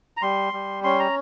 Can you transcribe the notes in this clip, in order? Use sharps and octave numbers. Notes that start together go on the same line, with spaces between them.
A#5
G3 C6
G3
C#4 C6
A#5